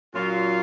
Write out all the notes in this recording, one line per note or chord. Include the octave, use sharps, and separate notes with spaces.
A#2 F#3 C#4 F4